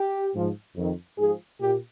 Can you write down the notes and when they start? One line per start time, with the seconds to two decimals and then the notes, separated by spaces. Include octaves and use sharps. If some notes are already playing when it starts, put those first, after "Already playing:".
Already playing: G4
0.34 G#2 F3
0.76 F2 D#3
1.19 G#2 F3 G#4
1.61 A#2 G4